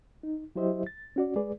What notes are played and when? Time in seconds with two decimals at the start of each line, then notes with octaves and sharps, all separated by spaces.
0.23 D#4
0.56 F#3 E4 G4 C5 D#5 E5
0.87 A6
1.16 C#4 F#4 D5
1.36 G#3 G#4 B4 D5